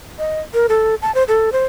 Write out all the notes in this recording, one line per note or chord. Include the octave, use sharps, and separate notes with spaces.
D#5
A#4
A4
A5
C5
A4
C5